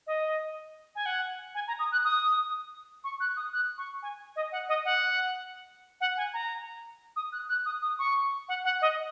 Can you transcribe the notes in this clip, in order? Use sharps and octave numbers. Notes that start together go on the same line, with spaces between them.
D#5
G#5
F#5
G#5
A#5
D#6
F#6
D#6
C#6
F#6
D#6
F#6
C#6
G#5
D#5
F#5
D#5
F#5
F#5
G#5
A#5
D#6
F#6
F#6
D#6
D#6
C#6
F#5
F#5
D#5